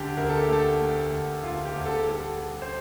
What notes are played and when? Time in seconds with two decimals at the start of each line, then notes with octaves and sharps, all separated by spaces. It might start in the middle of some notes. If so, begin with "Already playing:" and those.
Already playing: D2 D3 G4
0.17 D2 A#4
0.29 A4
0.41 G4
0.49 A3 A4
0.80 A3
1.12 D2
1.43 D2 F4
1.65 G4
1.76 D2
1.86 A4
1.96 G4
2.07 G3 A4
2.39 G3
2.62 C5